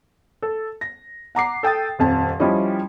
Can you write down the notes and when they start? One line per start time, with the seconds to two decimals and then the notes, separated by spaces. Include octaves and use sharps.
0.42 A4
0.81 A#6
1.35 F#5 A#5 D6 C7
1.63 A4 G5 D#6 A6
1.99 D#1 F2 A5
2.40 F3 G3 C#4 E4 D#5